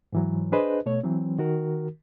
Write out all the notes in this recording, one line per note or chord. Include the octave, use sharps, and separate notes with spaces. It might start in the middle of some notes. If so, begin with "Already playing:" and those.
G#2 E3 F#3
D4 G#4 B4 C5 D#5
B2 A3 C#5
E3 F#3 C4
D#3 F#4 A#4